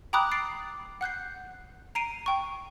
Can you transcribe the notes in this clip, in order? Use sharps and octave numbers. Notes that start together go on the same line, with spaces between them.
G5 A#5 B5 D6 D#6 F#6
A6 C7 D7
F#5 F#6 G6 C7
A#5 C7 D7 D#7
G5 C#6